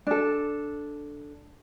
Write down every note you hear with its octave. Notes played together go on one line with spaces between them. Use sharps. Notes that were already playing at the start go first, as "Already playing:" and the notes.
D4 A4